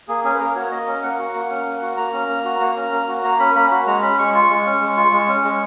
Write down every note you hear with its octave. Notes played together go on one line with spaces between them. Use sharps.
A#3 G#4
C#4 G#4
B4
A#3 A#4
F#4 C#5
A#3 D#5
C#4
A#3 F#5
F#4
A#3
C#4
A#3
F#4
A#3 A#5
C#4
A#3
F#4
A#3
C#4
A#3
F#4
A#3 A#5
C#4 B5
A#3 B5
F#4 B5
G#3 A#5
C#4 B5
G#3 C#6
F4 C#6
G#3
C#4
G#3
F4
G#3
C#4
G#3